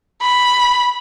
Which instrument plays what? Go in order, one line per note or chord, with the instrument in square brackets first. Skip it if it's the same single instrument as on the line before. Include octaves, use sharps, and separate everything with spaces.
[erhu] B5